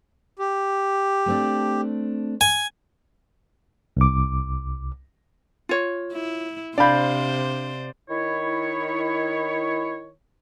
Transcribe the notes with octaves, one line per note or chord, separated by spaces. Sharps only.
G4
A3 C4 D4
G#5
C2 D6
F4 C#5
E4
C3 D4 C5 D5 F5 B5 G6
D#3 E4 C#5